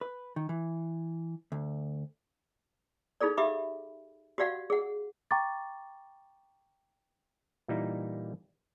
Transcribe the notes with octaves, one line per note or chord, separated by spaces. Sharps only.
B4
D#3
E3
D2
D#4 F4 G#4 A4 D5
G4 E5 F5 B5 D6
F#4 G4 D5 F5 F#5
G#4 F#5
G5 A#5 C#6 D6 A6
A#2 E3 G3 A#3 D#4 E4